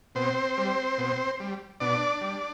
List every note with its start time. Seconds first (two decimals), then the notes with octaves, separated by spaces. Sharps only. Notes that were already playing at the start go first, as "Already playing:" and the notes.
0.15 B2 C4 C5
0.57 G3
0.98 B2
1.40 G3
1.80 B2 D4 D5
2.21 G3